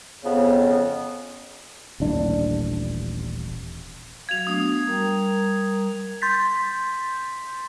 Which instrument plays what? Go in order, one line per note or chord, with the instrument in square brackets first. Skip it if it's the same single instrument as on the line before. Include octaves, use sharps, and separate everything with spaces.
[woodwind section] F2 C#3 B3
[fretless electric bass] D#1 A1 D4
[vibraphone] F#3 F#4 F5 [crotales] G#6 F7
[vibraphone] A3 B3 D4 [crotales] D#6
[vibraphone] G3 A#4 A#5
[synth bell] C6 G6 A6 B6